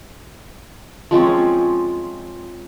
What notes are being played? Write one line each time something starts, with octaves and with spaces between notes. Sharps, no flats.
F3 G#3 C4 C#4